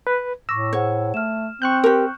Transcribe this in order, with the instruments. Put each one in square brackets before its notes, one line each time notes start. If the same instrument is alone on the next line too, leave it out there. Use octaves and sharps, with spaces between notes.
[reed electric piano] B4
[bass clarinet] A2 [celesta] C#6 D6 A#6 [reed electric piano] E6
[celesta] G#4 C5 F#5 [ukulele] C#5
[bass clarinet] A3 [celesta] F6 E7
[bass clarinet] C4 [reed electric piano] C#6 F#6 G6
[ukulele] G4 A#4